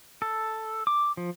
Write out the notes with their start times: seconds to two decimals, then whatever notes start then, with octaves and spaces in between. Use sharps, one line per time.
0.22 A4
0.87 D6
1.17 F3